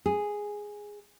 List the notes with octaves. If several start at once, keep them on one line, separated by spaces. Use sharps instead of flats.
G#4